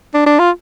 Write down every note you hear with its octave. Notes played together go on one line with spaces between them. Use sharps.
D4
D4
F4